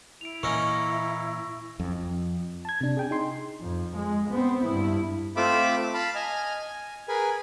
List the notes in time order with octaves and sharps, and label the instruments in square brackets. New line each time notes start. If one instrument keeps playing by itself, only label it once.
[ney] E4 [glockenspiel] D7 F7
[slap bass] A#2 E3 [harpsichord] A#3 C#4 D#4 [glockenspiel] C#6 E6 A#6
[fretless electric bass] F2
[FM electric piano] A5 G#6
C3 D4
G#4 G5 G#5
D#4 C6
[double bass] F2
G#3
B3 C4
G2 E4
[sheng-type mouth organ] A3 C4 F4 E5 B5 D6
F5 A5 B5
D#5 G#5 F6
G#5
G#4 A#4 B4 G#5